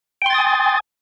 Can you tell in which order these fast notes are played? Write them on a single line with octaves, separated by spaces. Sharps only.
G5 C6 A6 D#6 G#5